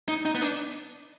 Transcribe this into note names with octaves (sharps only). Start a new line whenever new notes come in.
D#4
D#4
B3
D4